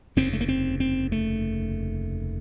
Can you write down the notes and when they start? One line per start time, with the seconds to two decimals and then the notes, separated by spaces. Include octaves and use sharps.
0.17 F1 D#2 C#3 C4
0.33 A3
0.41 A#3
0.48 C4
0.80 C4
1.12 A3